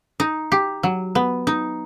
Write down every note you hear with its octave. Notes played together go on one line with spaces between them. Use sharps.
D#4
G4
F#3
B3
D#4